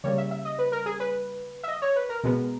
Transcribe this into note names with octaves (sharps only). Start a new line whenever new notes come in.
C#3 G3 A#3 C#5
E5
E5
D#5
B4
A#4
G#4
B4
E5
D#5
C#5
B4
A#4
B2 G#3 B3